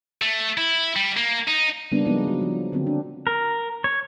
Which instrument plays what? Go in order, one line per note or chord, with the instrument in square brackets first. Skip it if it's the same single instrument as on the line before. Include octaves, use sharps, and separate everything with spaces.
[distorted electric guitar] A3
E4
G3
A#3
D#4
[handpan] C#3 G3 A#3 B3 D4
F3 G#3 A#3 B3 D#4
F#3
F3
D3 F#3 A#3 C4
D4
[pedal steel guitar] A#4
C#5